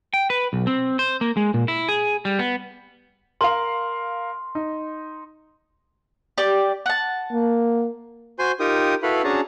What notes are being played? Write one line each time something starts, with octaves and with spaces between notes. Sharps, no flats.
G5
B4
B1
C4
C5
A#3
G#3
A#2
E4
G#4
G3
B3
A#4 F5 C6
D#4
G4 D5
F#5 A5
A#3
F#4 C5 G#5 C6 G6
D#4 F4 G4 A#4 G5 D#6
E4 F#4 A4 B4 F5 B5
C#4 D4 F#4 G#4 A5 A#5